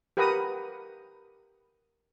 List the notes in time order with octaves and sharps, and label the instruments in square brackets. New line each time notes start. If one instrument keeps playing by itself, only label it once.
[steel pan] G4 A#4 B4 F#5 A#5 D#6